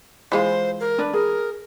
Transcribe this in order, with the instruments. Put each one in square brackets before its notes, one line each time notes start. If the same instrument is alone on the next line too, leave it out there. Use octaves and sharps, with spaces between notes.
[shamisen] E3 G#3 F4 [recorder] C5
[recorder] A#4
[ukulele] D4 B4 D5
[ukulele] G#4 [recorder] A#4